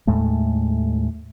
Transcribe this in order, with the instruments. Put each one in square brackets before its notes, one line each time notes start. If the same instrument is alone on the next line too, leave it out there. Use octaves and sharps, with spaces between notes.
[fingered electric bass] D#2 A2 G#3 A3